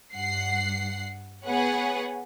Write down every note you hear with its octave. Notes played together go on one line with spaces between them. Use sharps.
G2 F#5 C7
B3 G#4 B4 C#5 F#5